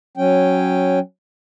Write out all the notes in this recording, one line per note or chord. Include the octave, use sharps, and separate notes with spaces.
F#3 C#4 G5